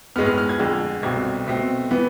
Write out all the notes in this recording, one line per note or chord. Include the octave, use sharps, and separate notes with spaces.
A2 G#3 B3 F6
F6
F6
G#6
F2 D3 G#3
C2 B2 A3 C4 G#6
B2 A3 C4
E3 B3